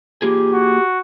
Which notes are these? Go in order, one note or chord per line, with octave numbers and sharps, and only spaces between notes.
A#3 F4 G4 G#4
F#4